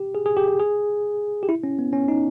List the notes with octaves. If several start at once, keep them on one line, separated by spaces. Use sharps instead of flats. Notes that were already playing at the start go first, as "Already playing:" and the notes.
Already playing: G4
G#4
G#4
G4
G4
G#4
G4
E4
C#4
B3
C#4
D#4